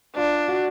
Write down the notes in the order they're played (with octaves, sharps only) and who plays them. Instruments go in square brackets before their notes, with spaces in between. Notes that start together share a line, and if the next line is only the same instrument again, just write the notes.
[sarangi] D4 [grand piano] F4
[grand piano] F#4